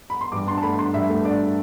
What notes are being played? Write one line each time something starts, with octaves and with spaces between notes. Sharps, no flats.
B5
C6
G2 D6
D4 C6
A5
A3 B5
D4 C6
G2 E5
A3
D4 D5